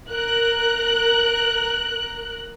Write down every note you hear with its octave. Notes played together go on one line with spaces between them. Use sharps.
A#4 F#6